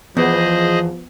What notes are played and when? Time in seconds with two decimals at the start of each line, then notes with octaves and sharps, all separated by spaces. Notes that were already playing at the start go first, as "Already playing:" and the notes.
0.17 E2 F3 B3 G#4 C5 D#5